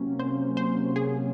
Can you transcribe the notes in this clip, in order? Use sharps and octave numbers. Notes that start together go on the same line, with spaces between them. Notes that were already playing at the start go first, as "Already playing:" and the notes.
Already playing: C3 F#3 A#3 C#4
C5
C5
G#4